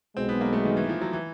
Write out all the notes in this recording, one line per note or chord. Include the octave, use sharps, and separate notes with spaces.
B1 B2 G#3 C4
B3
A#3
A3
D#3
E3
F3
F#3
E3